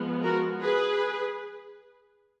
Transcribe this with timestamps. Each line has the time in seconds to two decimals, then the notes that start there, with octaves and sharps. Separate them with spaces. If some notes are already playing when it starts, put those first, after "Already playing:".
Already playing: F3 G#3 B3
0.23 F#4 A#4
0.61 G#4 B4